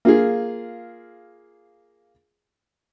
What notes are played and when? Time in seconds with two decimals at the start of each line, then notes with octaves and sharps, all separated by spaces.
0.05 A#3 F4 G#4